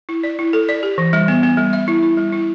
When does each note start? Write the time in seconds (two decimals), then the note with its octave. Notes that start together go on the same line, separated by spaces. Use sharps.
0.09 E4
0.23 D5
0.39 E4
0.53 A4
0.69 D5
0.83 G4
0.98 E3
1.13 G3
1.28 B3
1.43 B3
1.57 G3
1.73 E5
1.88 E4
2.03 E4
2.17 G3
2.32 E4